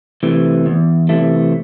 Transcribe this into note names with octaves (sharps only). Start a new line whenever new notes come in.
C3 E3 A3
E2
C3 E3 A3